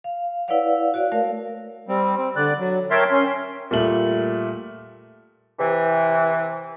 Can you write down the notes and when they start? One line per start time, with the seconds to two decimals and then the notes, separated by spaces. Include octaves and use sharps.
0.04 F5
0.48 E4 B4 C#5 D5 F5 F#5
0.94 F#4 C#5 D5 F5
1.12 A3 A#4 F5
1.89 G3 C4
2.18 C4
2.36 D3 D5 F#6
2.59 F#3
2.91 A#4 C#5 E5 G5 A5 C6
3.11 C#4 C6
3.71 A#2 G3 A3 F#7
5.59 C3 E3